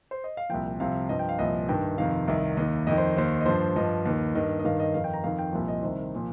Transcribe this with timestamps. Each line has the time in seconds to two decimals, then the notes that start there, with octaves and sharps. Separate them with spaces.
0.11 C5
0.24 D#5
0.37 F5
0.49 C2 A#2 F3 G5
0.80 C2 C3 F3 F5
1.09 G2 F3 D#5
1.19 G5
1.29 F5
1.38 C2 A#2 F3 D#5
1.69 G2 D#3 G5
1.98 F2 C3 D#3 F5
2.28 C2 C3 D#3
2.57 D#2 D#3 D#5
2.87 F2 D#3 D#5
2.97 C5
3.17 D#2 D#3 C5
3.41 D#5
3.46 G2 F3 C5
3.76 G2 F3 D#5
4.05 D#2 D#3
4.35 G2 D#3 D#5
4.59 D#5
4.65 G2 D#3 F5
4.80 D#5
4.94 F2 D#3 F5
5.04 G5
5.14 A#5
5.24 F2 D#3 F5
5.39 G5
5.53 C2 A#2 F3
5.68 D#5
5.83 C2 C3 D#3 C5
6.14 A#2 F3